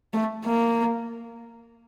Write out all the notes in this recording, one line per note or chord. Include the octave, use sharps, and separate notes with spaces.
A3
A#3